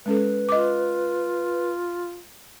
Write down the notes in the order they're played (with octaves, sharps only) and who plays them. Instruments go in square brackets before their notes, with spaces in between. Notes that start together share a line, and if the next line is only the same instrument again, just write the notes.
[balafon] G#3 C#4 A4 [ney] B4
[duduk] F4 [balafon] D#5 D6